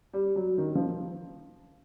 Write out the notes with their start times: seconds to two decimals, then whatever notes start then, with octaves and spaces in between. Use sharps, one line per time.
0.13 G3
0.36 F#3
0.58 D#3
0.75 F3